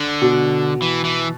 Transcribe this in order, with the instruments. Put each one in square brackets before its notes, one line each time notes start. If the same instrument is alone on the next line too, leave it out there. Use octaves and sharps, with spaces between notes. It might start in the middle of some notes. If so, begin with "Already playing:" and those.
Already playing: [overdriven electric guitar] D3
[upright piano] B2
[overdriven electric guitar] E3
E3